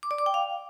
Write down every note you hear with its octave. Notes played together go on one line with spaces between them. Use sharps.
D6
D5
D6
G5
F5